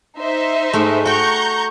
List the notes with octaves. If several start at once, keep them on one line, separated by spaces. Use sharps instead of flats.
D#4 C5 E5
G#2 G#3 A3
F#4 G5 A#5 C#6 G6